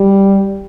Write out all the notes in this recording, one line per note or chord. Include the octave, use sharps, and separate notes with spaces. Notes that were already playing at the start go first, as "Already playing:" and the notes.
Already playing: G3